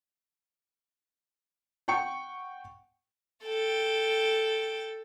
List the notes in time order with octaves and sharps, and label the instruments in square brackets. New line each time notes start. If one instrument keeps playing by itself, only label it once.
[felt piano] F#5 G5 C#6 C#7
[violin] A4 G5